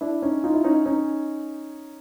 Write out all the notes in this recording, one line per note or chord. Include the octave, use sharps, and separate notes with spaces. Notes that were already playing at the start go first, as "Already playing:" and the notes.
D4 E4
C#4 D#4
D#4 F4
E4
C#4 D#4
C#4 D#4